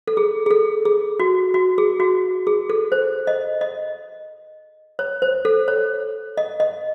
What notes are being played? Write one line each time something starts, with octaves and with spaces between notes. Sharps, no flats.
A4
G#4
G#4
A4
G#4
F#4
F#4
G#4
F#4
G#4
A4
C5
D#5
D#5
C#5
C5
A4
C#5
D#5
D#5